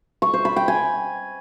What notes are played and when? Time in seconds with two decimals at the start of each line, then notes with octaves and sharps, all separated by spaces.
0.22 C#6
0.33 C5
0.45 B5
0.56 G5
0.68 G#5